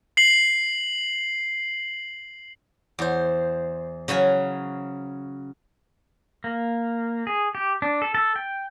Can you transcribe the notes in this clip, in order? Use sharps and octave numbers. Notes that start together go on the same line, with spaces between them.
C7 F#7
E2 C5
C#3 F#3 F5 G#5
A#3
G#4
G4
D4
A4
A4
G5